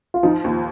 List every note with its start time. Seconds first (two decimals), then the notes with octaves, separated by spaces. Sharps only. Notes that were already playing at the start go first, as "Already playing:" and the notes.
0.14 F4
0.23 F3 D#4
0.44 D#2 D#4